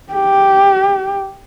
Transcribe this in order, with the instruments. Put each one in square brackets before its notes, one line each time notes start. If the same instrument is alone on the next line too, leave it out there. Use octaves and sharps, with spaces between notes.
[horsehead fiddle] G4